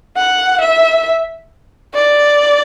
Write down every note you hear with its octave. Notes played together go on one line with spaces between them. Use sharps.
F#5
E5
D5